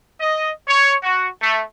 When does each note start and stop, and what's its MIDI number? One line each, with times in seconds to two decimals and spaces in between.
0.20 0.49 75
0.67 0.94 73
1.03 1.27 66
1.40 1.60 57